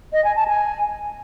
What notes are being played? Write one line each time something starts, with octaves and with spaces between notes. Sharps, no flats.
D#5
G#5
A5
G#5